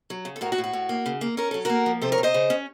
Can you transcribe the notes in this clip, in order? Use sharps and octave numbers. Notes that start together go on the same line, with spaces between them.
F#3
C#3
A4
A2 F#4 A#4
F#4
A2
F#4
A2
A#3
C#3
A#3
C#4 A#4
F#3 A4
A#3 F#4 A#4
F3
C3 A4 C5
A#4 C#5
C3
C5 D#5
C#3
C#4